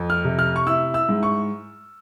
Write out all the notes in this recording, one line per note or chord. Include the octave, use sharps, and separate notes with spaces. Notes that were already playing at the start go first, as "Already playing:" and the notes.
Already playing: F2
F6
C3
F6
C#6
E4 E6
E6
G#2
C#6